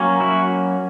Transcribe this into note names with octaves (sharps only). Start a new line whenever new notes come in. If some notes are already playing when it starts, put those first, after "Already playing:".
Already playing: F#3 A#3 C#4
E4 F#4